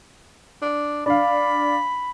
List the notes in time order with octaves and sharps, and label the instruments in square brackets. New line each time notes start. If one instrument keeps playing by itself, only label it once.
[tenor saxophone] D4
[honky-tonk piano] D4 F5 [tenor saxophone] D5 [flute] B5